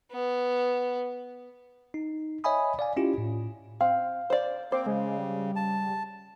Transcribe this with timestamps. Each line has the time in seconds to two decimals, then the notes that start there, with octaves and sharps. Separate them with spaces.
0.12 B3
1.94 D#4
2.44 C#5 D#5 E5 G#5 B5 D#6
2.79 D5 F5 G#5
2.97 C#4 E4 F4 G4
3.18 A2
3.81 C4 F5
4.30 C5 D5
4.72 A#3 C4 C5 D6
4.86 C#3 G#3
5.18 G3
5.56 A5